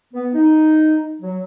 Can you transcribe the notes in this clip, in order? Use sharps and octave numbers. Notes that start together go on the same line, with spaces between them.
B3
D#4
F#3